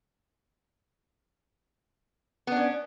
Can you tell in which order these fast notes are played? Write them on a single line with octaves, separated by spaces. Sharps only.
B3 D4 C#4